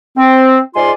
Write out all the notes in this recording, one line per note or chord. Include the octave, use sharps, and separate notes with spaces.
C4
G#2 G#3 F4 D5 G#5 C6